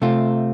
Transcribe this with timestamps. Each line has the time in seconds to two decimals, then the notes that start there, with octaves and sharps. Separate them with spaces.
0.02 C3 A3 C4 F4